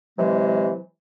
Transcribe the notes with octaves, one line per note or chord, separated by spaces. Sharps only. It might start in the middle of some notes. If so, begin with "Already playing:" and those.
C3 E3 F#3 G#3